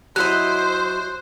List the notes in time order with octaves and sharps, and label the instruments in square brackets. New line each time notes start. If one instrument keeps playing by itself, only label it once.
[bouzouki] F#3 E4 D#5 [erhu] C5 [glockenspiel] F#6